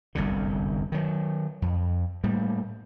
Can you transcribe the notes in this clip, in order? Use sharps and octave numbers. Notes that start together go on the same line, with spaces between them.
G1 C2 F#2 D3
D#3 F#3
F2
A2 G3 A#3